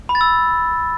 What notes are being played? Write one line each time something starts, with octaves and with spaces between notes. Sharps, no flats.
B5
A6
E6